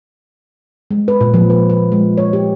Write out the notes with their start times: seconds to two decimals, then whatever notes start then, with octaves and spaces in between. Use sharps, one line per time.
0.91 G#3
1.08 B4
1.21 A#2
1.34 F3
1.50 B4
1.70 B4
1.92 G#3
2.18 C#5
2.33 G4